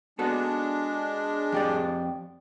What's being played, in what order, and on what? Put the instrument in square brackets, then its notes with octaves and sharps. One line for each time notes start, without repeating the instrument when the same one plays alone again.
[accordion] G#3 D4 [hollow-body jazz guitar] B3 F#4 A4
[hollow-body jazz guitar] F2 G4 D5